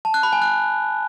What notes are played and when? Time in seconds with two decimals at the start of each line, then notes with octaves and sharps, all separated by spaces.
0.05 A5
0.14 F#6
0.23 B5
0.33 G#5
0.42 F#6